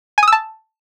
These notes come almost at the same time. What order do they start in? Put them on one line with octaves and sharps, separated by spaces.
G#5 D#6 E6 A5